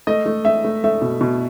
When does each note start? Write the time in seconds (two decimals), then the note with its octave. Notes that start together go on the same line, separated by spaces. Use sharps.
0.07 A3 D#5
0.26 A3
0.45 A3 E5
0.65 A3
0.84 A3 E5
1.02 B2
1.21 B2